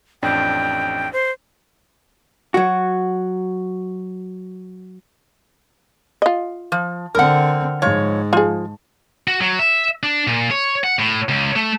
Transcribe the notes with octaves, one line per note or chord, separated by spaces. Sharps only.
A1 F2 D4 G5
C5
F#3 F#4
F4 D#5
F3
D3 C4 A#4 F#5
G#2 F3 C#5
F3 F4 G#4
F#4
F#3
E5
D4
A#2
C#5
F#5
A2
C#2
A3